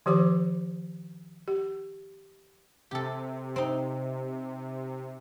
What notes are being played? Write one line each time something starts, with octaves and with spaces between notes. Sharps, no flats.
D#3 F3 G4 C5 D6
G4
C3 G4 A4
C4 D#4